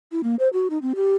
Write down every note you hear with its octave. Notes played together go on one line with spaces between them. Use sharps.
E4
A#3
C5
F#4
D#4
C4
G4